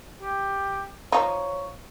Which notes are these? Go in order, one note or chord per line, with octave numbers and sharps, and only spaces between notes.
G4
F3 D#4 C#5